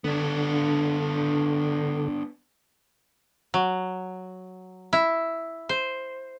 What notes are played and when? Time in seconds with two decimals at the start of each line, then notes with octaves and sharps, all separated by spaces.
0.04 D3 B3 D4
3.54 F#3
4.93 E4
5.69 C5